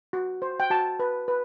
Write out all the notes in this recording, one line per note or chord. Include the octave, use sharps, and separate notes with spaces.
F#4
C5
G5
F#4 A5
B4
B4